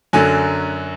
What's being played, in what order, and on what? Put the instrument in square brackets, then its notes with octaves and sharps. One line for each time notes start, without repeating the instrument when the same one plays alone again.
[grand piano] F#2 D3 F#3 G#5